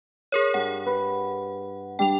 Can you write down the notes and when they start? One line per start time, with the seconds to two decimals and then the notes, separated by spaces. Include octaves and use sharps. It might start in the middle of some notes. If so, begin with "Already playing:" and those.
0.32 G#4 A#4 C#5
0.54 G2 F#5
0.86 B4
1.99 G3 D4 G5 F7